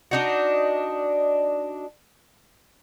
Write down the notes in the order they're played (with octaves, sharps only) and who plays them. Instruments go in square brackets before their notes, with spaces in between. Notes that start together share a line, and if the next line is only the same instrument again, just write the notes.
[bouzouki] D4 D#4 F#4